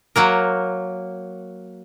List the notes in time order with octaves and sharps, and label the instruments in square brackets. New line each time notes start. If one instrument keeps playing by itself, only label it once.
[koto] F#3 A#3 A#4